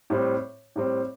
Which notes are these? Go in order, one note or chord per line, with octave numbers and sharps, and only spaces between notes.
A2 G3 C4
A2 G3 C4